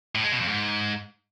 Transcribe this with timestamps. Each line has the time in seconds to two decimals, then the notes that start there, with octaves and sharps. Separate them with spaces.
0.15 A2
0.23 G#3
0.32 B2
0.40 F2
0.48 G#2